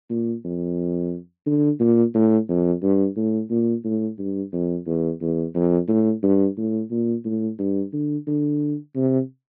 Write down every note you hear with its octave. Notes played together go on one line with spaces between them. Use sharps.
A#2
F2
D3
A#2
A2
F2
G2
A2
A#2
A2
G2
F2
E2
E2
F2
A2
G2
A2
A#2
A2
G2
D3
D3
C3